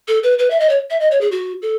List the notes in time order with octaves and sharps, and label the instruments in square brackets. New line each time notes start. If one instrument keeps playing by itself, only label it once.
[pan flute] A4
B4
B4
E5
D#5
C#5
E5
D#5
C#5
G#4
F#4
A4